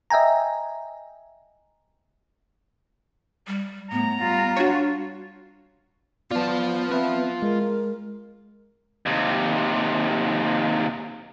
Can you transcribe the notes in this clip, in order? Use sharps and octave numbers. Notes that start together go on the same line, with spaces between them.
D#5 E5 G5 G#5 A#5
G3
A2 B3 A#5
G3 F4
D4 F#4 C#5
B3 F4 D5 A5
B3 C4 B4 E5
G#3 A#4
D#2 C3